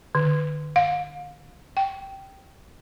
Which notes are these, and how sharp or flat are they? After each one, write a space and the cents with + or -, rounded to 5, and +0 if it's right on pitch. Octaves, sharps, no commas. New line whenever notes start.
D3 +40
F5 +35
G5 -10